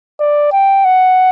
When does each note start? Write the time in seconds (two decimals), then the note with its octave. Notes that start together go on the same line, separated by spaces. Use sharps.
0.20 D5
0.52 G5
0.85 F#5